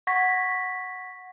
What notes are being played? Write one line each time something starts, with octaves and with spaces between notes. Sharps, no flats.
F#5 C#6 G#6 A#6 B6